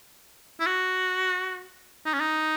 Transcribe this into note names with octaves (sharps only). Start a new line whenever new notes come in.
E4
F#4
D#4
C#4
D#4